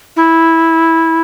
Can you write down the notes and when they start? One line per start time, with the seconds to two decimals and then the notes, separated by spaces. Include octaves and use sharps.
0.16 E4